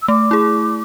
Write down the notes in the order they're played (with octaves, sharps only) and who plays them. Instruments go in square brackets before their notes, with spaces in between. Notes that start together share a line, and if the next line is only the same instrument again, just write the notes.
[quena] E6
[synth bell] A3 [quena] D6
[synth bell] E4 G#4